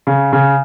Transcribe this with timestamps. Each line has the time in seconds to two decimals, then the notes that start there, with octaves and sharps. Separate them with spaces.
0.07 C#3
0.33 C#3